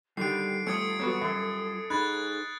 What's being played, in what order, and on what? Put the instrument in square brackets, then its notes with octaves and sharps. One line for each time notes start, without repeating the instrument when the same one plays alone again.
[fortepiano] D3 D#3 [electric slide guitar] G3 G4 [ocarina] A4 [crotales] C7 D7
[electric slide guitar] G3 F4 [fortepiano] A3 [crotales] D#6 G#6 C#7
[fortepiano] F#3 B3 F#4
F#2
[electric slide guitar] D#4 G#4 [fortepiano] B5 [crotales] F#6 G#6 A6